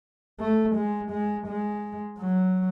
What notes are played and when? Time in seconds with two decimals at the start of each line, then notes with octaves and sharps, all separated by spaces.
0.40 A3
0.76 G#3
1.12 G#3
1.48 G#3
2.19 F#3